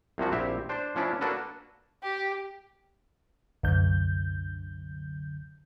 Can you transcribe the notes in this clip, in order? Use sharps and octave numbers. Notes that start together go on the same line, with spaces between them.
C2 C3 F3 F#4
A#1 C4 E4 G4 E5
D4 C5
F3 C#4 D4 E4
A#3 D4 F#4 A4 B4
G4
C2 F#2 D3 G6